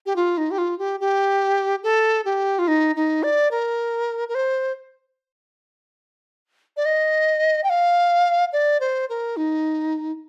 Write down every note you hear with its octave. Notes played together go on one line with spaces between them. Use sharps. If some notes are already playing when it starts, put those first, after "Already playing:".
G4
F4
D#4
G4
F4
G4
G4
A4
G4
F4
D#4
D#4
D5
A#4
A#4
C5
D5
D#5
G5
F5
D5
C5
A#4
D#4